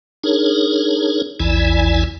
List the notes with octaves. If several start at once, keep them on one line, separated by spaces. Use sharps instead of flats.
D4 D#4 G#4 A#4 C#5
A#1 E2 E3 E4 D5 G#5